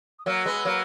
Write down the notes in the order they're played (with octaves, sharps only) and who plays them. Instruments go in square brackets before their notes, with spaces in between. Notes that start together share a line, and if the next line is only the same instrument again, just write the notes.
[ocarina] D#6
[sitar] F#3 A#3 [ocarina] E6
[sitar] G#3 B3
F#3 A#3